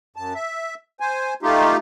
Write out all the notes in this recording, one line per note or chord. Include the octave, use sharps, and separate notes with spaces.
F#2 A5
E5
C5 G#5
A3 D#4 F4 G4